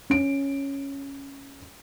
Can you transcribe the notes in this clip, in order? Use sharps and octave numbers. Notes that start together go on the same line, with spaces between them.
C#4 D7